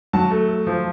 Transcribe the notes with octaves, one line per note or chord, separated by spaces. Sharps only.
F#3 A5
A3
A3
F3